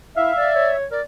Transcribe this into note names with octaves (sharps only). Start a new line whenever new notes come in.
E4 E5 F5
D5
C#5
A#4 D5